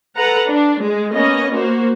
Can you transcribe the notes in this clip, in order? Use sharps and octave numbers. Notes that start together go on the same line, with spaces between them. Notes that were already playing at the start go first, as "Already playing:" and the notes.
A4 B4 F#5 A#5
D4
G#3
A#3 B3 C#4 D#5
A#3 F#4 C5